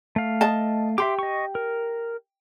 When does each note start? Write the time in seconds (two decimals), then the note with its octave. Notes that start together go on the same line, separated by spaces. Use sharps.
0.16 A3 F5
0.41 D#5 A5
0.98 G4 E5 C6 D6
1.19 D#5 C#6
1.55 A#4